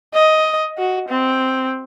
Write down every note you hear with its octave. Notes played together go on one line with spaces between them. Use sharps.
D#5
F#4
C4